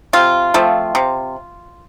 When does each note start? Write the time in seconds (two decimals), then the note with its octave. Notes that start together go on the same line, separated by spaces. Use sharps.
0.13 C3 F4
0.54 F3 A3 C4
0.95 C3